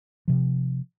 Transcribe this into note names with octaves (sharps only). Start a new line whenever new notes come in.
C3 F3